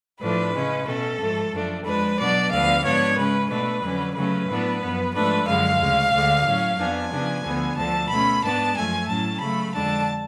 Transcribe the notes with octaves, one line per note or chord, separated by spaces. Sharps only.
A2 F3 A3 D4 B4
C#3 G#3 C#4
B2 A3 C#4 A4
G#2 F3 A3
F#2 F3 A3 D4
F2 F3 G#3 D4 B4
B2 F#3 B3 D4 D5
D2 D3 F3 B3 F5
G#2 F3 B3 D4 C#5
C#3 G#3 C#4 B4
B2 A3 D4 B4
F2 D3 F#3 C#4
C#3 F#3 A3 C#4 B4
A2 F#3 B3 D4
F#2 F3 B3
G#2 F3 A3 D4 B4
F#2 D3 F3 G#3 F5
D2 C#3 G#3
D2 D3 G#3
A2 F#3 C#4
F2 F3 B3 D4 G#5
C#3 F3 B3 D4
D2 D3 F3 B3
D2 D3 F3 A5
B2 A3 C#4 B5
G#2 G#3 B3 D4 A5
F#2 F3 A3 G#5
A2 F#3 C#4 A5
C#3 F#3 A3 B5
F2 D3 G#3 D4 A5